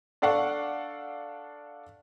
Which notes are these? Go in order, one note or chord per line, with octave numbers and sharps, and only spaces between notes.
D4 A4 D5 F5 F#5 C#6